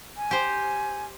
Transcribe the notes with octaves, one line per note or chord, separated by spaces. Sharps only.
G#5
G4 C5